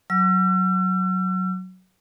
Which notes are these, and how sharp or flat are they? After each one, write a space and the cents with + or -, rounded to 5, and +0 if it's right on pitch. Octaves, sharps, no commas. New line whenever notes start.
F#3 +0 E6 +45